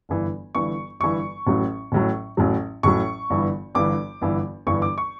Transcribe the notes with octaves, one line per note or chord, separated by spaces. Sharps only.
G1 G2 E3
G1 G2 E3 C#6
G1 G2 E3 C#6
A1 A2 F#3
A1 A2 F#3
A1 A2 F#3
A1 A2 F#3 C#6
G1 G2 E3
G1 G2 E3 D6
G1 G2 E3
G1 G2 E3 C#6
D6
C#6